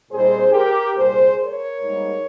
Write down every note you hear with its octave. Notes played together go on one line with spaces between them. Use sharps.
A#2 G3 C4 D#4 G#4 C5
G4 A#4
C2 A#2 G3 G#4 C5
A#4 C#5
G#2 G3 A#3 D#4